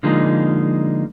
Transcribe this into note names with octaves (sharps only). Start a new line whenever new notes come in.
D3 F3 G#3 A#3 D#4